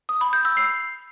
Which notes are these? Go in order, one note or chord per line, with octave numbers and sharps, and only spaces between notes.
D#6
B5
G6
E6
C7